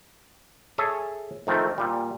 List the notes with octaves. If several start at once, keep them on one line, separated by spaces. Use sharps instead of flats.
G#4 A4 C#5 E5 G#5 A5
F2 D#3 A3 C4
A#2 G3